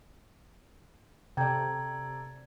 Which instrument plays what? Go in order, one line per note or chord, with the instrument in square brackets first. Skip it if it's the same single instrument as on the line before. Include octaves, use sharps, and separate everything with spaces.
[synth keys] C3 [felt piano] A4 D5 [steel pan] G5 [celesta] A#5 G#6